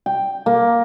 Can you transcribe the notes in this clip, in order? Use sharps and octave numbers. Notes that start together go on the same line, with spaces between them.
G5
A#3